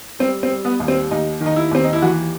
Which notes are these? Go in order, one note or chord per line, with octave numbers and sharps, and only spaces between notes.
G3 C4
C4
G3
B3
D#2
C4
D#2 D#4
D#3
D#4
E4
D#2 C4
D#4
E4
E3 F#4